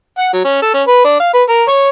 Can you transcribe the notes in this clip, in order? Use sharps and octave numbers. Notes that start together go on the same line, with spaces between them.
F#5
F#3
C#4
A4
C#4
B4
D4
F5
B4
A#4
C#5